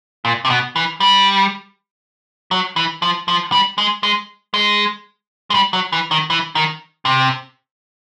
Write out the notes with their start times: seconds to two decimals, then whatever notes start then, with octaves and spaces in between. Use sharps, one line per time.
0.25 A#2
0.45 C3
0.50 B2
0.76 E3
1.00 G3
2.51 F#3
2.76 E3
3.02 F3
3.28 F3
3.52 G3
3.78 G#3
4.03 G#3
4.54 G#3
5.50 G#3
5.54 G3
5.73 F#3
5.93 E3
6.11 D#3
6.30 E3
6.55 D#3
7.05 C3